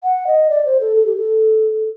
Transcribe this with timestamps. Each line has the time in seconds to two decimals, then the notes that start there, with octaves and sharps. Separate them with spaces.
0.04 F#5
0.27 D#5
0.50 D5
0.66 C5
0.81 A4
0.96 A4
1.06 G4
1.17 A4